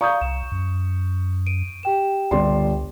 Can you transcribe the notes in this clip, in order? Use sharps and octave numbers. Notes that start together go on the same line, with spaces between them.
D5 F5 A#5 C#6 D#6 G6
C2 E7
F#2
D7 D#7
G4 G5 E7
G1 C#2 D5 C6